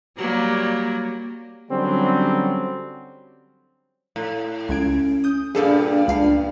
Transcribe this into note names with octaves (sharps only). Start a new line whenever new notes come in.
F#3 G3 A#3
D3 F#3 G3 C4 C#4
A2
C#2 C#4 G#6 D7
D#6 G6
G2 A#2 D4 G#4 A4 D5
C#2 D4 F5 C7